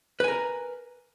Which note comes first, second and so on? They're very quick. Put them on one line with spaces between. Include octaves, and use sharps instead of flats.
B4 G#5 A#4